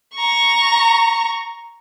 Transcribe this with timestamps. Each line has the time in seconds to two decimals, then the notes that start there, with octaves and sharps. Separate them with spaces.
0.15 A#5 C#6